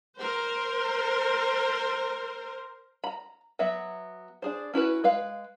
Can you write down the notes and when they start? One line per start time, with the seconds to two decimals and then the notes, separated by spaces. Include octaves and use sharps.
0.20 A#4 C5
3.04 A#5 B5
3.59 F#3 B3 E5
4.42 D4 G#4 C5
4.74 C#4 E4 F#4 B4
5.04 G#3 B4 F5